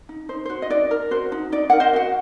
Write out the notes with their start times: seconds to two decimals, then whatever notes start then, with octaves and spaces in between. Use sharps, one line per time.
0.09 D#4
0.29 D#4 C5
0.45 C5
0.50 F#4
0.62 D#5
0.70 D#4 D5
0.91 A#4
1.11 F#4 C5
1.32 D#4
1.52 D#4 D5
1.70 A#4 F#5
1.80 C5 D#5
1.93 F#4 F#5